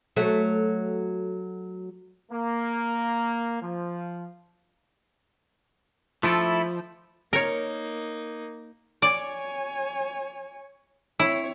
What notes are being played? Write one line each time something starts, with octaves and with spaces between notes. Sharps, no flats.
F#3 A3
A#3
F3
F3 A3 E4 A4
A#3 D#4 A#4 C#5
C#5 D5 G#5
C4 E4 C#5